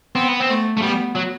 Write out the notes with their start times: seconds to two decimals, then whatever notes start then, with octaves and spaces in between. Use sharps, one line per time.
0.15 B3 C4
0.29 B3
0.40 C4
0.49 A3
0.78 A3
0.83 G3 B3
1.16 F#3